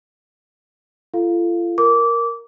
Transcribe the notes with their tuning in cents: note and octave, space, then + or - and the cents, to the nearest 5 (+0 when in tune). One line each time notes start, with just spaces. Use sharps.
F4 -40 A4 +0 F5 +0
A#4 +0 D6 -20